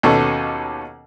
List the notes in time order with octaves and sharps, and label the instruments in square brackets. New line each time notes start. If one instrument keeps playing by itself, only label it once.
[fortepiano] D#2 B2 C#4 A4